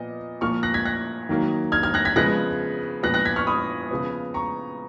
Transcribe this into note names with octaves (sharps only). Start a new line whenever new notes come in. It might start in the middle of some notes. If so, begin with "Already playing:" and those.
Already playing: A#2 F3 B3 D#5
A#2 F3 A#3 C#6 F6
F#6 A#6
G#6 B6
F#6 A#6
D#3 F#3 A#3
F6 G#6
F6 G#6
F#6 A#6
G#6 B6
C#3 F3 G#3 B3 F#6 A#6
A#2 F3 B3 F#6 A#6
F#6 A#6
G#6 B6
C#6 F6
B5 D#6
C#3 F3 B3
A#5 C#6